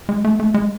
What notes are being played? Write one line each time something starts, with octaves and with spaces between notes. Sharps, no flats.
G#3
A3
A3
G#3